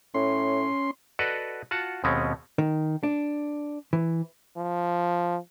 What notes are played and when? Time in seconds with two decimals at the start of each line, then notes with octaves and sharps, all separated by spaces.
0.14 A2 C#4 C6
1.19 F#4 A4 B4 D5 D#5 F#5
1.71 F4 F#4 F#5 A5
2.04 D#2 B2 G#3 C4 C#4
2.58 D#3
3.03 D4
3.93 E3
4.57 F3